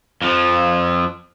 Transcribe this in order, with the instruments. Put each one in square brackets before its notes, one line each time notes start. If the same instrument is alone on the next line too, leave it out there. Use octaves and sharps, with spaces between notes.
[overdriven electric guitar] F2 F3